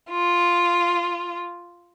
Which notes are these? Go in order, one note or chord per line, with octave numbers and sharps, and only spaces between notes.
F4